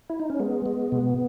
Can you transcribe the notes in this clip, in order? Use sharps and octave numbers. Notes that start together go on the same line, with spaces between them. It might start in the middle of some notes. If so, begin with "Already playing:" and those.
E4
D#4
C#4
G#3 B3
G#3
B2